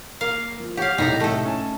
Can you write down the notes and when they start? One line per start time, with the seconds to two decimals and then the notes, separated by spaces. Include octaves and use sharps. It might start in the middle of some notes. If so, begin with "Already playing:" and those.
0.21 A#3 F5
0.60 F3
0.77 G4 C#5 F5 F#5
0.98 C2 A2 D#4 G4 A#5
1.20 A3 A4
1.43 C#4 G#5 A5